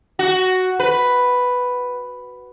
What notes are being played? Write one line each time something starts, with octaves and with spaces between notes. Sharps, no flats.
F#4
B4